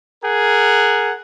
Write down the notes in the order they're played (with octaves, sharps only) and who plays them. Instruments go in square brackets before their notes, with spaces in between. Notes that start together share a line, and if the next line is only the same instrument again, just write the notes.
[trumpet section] G#4 A#4 F#5